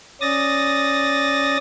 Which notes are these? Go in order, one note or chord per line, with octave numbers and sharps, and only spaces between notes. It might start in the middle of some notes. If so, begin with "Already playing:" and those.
C#4 D5 D#6 A6 A#6